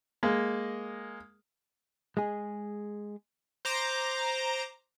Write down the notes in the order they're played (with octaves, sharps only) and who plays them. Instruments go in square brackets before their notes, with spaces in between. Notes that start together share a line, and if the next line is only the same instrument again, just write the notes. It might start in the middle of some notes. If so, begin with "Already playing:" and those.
[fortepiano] G#3 A#3
[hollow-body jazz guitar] G#3 G#4
[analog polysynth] C5 A#5 D6